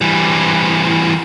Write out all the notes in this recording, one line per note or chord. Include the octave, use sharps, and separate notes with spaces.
E3 G3